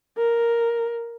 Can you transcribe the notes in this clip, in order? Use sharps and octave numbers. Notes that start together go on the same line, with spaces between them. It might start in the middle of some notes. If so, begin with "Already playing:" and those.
A#4